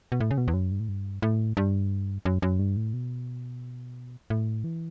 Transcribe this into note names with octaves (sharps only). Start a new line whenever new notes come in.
B2
A2
C#3
B2
E2
F#2
G2
A2
G2
A2
G2
F#2
F#2
G2
A2
B2
A2
E3